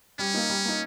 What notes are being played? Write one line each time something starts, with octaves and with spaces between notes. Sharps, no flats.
G3 C#4
A#3 D#4
G3
A#3 D#4